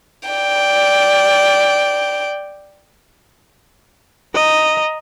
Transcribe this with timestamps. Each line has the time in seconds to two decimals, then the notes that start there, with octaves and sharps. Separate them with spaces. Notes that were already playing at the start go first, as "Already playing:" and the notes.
0.29 D5 G5
4.34 D#5 A#5